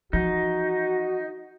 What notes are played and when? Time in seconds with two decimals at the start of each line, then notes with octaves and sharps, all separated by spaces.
0.13 E3 F3 D#4 F#4